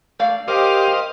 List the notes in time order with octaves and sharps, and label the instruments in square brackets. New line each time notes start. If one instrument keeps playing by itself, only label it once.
[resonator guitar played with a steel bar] A3 D5 F5
[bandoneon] G4 D6 [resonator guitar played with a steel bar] A#4 [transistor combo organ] C5 D#5 F5